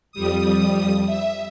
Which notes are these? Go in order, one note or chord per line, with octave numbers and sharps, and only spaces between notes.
F2 G3 D#6
E5